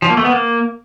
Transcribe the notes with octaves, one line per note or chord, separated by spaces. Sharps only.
F3
A#3
A3
B3
A#3